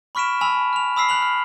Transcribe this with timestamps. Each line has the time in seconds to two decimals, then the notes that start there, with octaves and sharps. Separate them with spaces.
0.15 B5 C#6 F6 B6 D7 E7
0.41 G#5 A5 B5 E6 F7
0.73 F6 F7
0.96 B5 D#6 E6 B6 C7
1.09 F#6 F7 F#7
1.22 F6